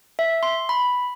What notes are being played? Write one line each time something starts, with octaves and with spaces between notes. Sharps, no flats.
E5
C6
B5